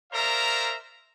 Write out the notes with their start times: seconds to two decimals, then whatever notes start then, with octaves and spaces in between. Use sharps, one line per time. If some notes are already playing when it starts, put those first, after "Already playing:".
0.13 A#4 C5 D5 E5 F5 A#5